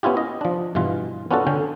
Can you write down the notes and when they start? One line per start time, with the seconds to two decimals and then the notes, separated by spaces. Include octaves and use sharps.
0.03 B3 C#4 E4 F4 G4
0.17 D#5
0.41 F3 D4
0.75 G2 B2 E3 F4
1.31 B3 C#4 D4 F4 F#4 A4
1.47 D3 C#4 G5